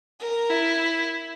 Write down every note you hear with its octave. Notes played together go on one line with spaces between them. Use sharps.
A#4
E4